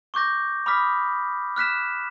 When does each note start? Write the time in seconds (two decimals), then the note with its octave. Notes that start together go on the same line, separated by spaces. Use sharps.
0.14 C#6 D6 G6 A#6
0.66 B5 D6 D#6 F6 B6
1.56 F6 F#6 B6 E7